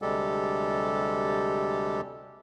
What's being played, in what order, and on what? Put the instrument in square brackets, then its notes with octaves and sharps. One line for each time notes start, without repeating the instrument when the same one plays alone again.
[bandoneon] D2 C3 G3 G#3 G4 A4